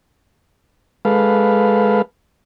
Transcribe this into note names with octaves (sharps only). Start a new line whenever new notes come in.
G#3 A4 B4 F5